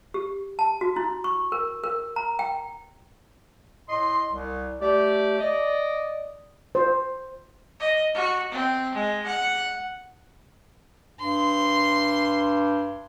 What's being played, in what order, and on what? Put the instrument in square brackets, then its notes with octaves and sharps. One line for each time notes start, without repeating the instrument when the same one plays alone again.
[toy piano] G4
A5
F#4
E4
C#6
A#4
A#4
A#5
G5
[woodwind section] A2 D#5 C6
C2
A3 G4 D5
D5 D#5
[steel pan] C5
[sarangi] D#5
F#4
C4
G#3
F#5
[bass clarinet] G2 [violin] C6